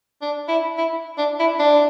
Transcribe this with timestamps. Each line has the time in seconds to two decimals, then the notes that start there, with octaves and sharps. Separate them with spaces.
0.22 D4
0.48 E4
0.77 E4
1.18 D4
1.40 E4
1.59 D4